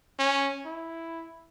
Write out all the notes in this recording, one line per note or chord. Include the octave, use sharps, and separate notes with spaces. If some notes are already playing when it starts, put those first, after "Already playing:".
C#4
E4